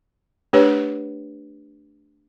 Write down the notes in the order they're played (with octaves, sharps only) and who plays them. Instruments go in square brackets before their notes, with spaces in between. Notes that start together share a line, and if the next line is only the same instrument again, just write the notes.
[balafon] A3 D4 G4 B4 C#5